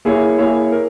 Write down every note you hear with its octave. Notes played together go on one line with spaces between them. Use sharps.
A#3 E4 G#4 C#5
A#3 E4 G#4 C#5
A#4